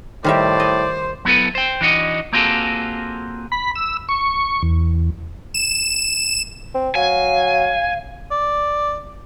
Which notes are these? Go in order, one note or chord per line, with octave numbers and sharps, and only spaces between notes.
A2 D#3 G3 C5 D5 E5
D#5
F#3 B3 E4 A4 B4
C5 G5
E3 D4 D#4 F#4 D#5
A#3 C4 F4 F#4 G#4 A4
B5
E6
C#6
E2
E7
C4
F#3 F5 G#5
D5